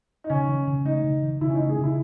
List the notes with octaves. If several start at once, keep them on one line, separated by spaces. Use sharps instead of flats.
D#4
C#3 C#4
E3
C#3
A3 D#4
C#3
E3
C#3 E4
C#4
A3 D#4
G#4
C#3 E4